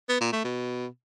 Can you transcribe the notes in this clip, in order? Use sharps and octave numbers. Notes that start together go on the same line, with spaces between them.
B3
A#2
A3
B2